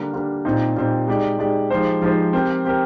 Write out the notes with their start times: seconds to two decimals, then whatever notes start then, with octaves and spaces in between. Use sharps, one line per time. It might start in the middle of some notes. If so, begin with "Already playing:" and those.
Already playing: D3 G3 A#3
0.13 D3 G3 A#3
0.45 A#2 G3 C4 D#4
0.76 A#2 G3 C4 D#4
1.07 G#3 D#4 G4 D5
1.39 G#3 D#4 G4 D5
1.70 F3 G#3 D#4 G4 C5
2.02 F3 G#3 D#4 G4 C5
2.33 C4 G4 A#4
2.65 C4 G4 A#4